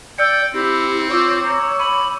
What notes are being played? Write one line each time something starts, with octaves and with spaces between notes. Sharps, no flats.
D5 G5 E6 G6 C#7
C4 E4 G4
F4 C#5 D6 E6
A#5
B5 C#6